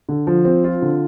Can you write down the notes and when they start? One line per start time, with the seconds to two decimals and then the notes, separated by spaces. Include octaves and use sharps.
0.09 D3
0.27 F3
0.45 C4
0.64 F4
0.82 D3